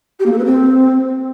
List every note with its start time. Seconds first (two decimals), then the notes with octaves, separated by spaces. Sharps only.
0.19 G4
0.26 A#3
0.32 A4
0.38 B4
0.45 C4